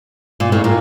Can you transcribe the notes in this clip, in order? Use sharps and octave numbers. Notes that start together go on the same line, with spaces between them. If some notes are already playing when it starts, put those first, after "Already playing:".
A#2
A2
A#2